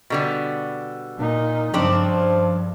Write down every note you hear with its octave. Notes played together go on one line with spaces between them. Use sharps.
B2 D3 G3
A#2 D#4
G2 C#3 F3 C4 D4